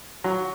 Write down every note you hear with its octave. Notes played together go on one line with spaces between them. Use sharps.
F#3